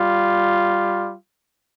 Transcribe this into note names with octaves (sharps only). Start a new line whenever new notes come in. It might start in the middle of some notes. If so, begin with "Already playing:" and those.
Already playing: G3 F4